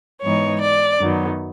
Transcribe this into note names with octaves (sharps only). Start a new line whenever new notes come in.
G#2 E3 G#3 B3 D#4 C#5
D5
F#2 D#3 F#3 B3